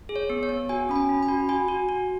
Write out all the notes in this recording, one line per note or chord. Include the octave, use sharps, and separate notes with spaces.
G#4
C#5
B3
C#5
B3
F#4 G#5
C#4 B5
G#5
C#4
B5
F#4
F#4 G#5
F#4
F#4